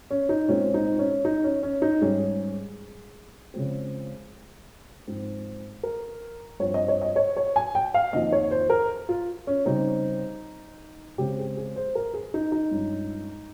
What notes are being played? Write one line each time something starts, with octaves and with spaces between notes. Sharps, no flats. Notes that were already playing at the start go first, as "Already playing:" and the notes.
C#4
D#4
A#2 G#3 C4 C#4
D#4
C#4
D#4
C#4
C#4
D#4
G#2 G3 C#4 G#4
C#3 F3 G#3 C4
G#2 F3 C4
A#4
G2 F3 C4 C#5
D#5
C#5
D#5
C#5
C#5
G#5
G5
F5
F2 D#3 A#3 D#5
C#5
C5
A#4
F4
C#4
C#3 G3 C4 D#4
C#3 G#3 C4 G4
G#4
G#4
C5
A#4
G#4
D#4
D#4
G2 F3 G#3 C#4